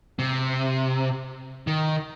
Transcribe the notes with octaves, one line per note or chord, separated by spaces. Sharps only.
C3
D#3